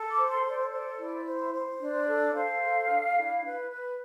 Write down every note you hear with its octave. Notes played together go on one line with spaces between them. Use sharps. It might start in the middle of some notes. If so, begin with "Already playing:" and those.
Already playing: A4
D6
C5
C6
A4
D5
C5 D5
E4 D5
C5
C5
D4
A4
C5 F5
A4
D4
E4
B4
B4